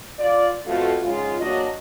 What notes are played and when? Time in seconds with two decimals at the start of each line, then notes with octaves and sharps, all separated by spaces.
0.19 F4 D5
0.66 F2 A3 B3 F4 F#4
1.02 G#2 C#3 G#3 F4
1.41 E2 F#3 A#3 D4 F#4 D#5